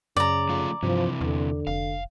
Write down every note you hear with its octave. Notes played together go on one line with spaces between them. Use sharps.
F#2 C#3 D5 A#5
F3 A3 F4
G2 C3 E3 F3
E2 D3
F1 F5